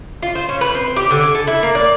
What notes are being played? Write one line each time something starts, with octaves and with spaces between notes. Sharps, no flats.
F4
C5
C#4
B4
C4
G4
D3
G#5
A4
E4
A#3
D5